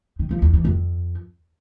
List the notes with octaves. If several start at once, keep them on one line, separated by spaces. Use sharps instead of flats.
D#3
F3
E2
E3
F2